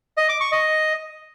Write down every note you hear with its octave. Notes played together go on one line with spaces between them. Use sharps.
D#5
D6
C#6
D#5